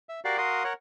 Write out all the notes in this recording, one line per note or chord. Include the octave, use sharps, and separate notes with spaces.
E5
F#4 G4 A#4 D5 F5
F#4 A#4 F5 C6 D#6
A#4 C#5 F#5